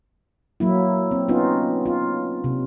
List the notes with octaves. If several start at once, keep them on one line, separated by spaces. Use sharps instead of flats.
F#3 A#3 E4
C4
B3 C#4 D#4 F4
F4
C3